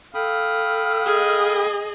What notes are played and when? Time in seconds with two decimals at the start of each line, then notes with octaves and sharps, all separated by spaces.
0.15 A4 F5 G5 B5 D#6
1.07 G#4 D#5